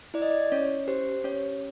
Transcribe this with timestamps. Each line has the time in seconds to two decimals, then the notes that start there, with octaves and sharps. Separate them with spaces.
0.14 E4 D5
0.22 D#5
0.31 D5
0.52 C#4 C#5
0.88 G4 C5
1.24 C#4 C#5